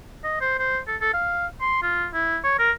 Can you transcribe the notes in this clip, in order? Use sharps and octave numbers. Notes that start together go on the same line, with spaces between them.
D#5
C5
C5
A4
A4
F5
C6
F4
E4
C#5
A#4